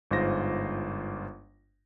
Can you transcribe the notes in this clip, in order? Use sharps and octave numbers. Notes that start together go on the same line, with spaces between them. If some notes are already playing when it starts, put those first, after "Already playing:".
G1 G#2 F4 C5 A#6